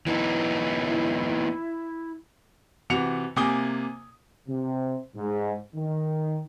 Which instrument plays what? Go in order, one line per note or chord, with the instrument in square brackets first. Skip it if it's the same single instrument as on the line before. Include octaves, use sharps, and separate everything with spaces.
[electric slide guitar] E3 B3 D#4 [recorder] E4
[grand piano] C3 E3 F#4 C#7 F7
C3 A#3 G#5 D6 D#6 G7
[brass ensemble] C3
G#2
D#3